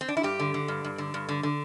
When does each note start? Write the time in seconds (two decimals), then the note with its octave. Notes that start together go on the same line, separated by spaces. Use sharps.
0.01 C4
0.09 D4
0.17 E4
0.23 G2 G4
0.40 D3
0.54 D3
0.68 G2
0.84 G2
0.98 D3
1.14 G2
1.29 D3
1.43 D3